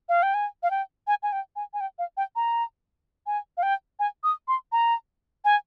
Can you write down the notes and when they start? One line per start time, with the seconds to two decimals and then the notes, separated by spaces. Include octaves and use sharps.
0.09 F5
0.23 G5
0.34 G#5
0.63 F5
0.71 G5
1.07 G#5
1.23 G#5
1.32 G5
1.56 G#5
1.74 G#5
1.81 G5
1.99 F5
2.17 G5
2.36 A#5
3.26 G#5
3.57 F5
3.63 G5
3.99 G#5
4.24 D#6
4.48 C6
4.72 A#5
5.45 G#5